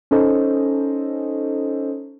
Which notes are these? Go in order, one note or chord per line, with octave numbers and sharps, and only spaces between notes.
C#4 D#4 A4 C5 D#5